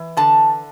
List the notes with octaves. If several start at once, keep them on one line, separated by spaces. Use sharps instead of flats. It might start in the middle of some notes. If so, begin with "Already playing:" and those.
Already playing: E3
D3 A5